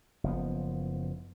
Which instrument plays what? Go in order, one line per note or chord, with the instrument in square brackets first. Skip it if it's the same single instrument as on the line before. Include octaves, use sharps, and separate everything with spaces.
[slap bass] F#1 F3 B3